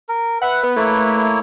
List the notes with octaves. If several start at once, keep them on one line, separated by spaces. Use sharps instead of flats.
A#4
B4 E5 F#5
B3
A3 A#3 E4 C#5